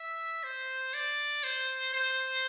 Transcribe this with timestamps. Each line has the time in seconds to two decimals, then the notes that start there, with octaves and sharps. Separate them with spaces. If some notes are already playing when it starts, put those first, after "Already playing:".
Already playing: E5
0.43 C5
0.94 D5
1.43 C5
1.93 C5